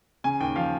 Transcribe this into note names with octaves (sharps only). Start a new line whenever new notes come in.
C#3 G#5
D#2 G5
F3 F5